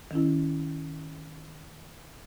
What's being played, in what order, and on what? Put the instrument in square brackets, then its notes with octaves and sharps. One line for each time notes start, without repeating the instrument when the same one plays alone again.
[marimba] D#3 C#4 E4